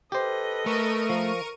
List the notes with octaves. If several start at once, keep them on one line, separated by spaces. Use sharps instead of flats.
G4 A4 B4 C5 D#5
A3 A#4 C#6 D#7
F3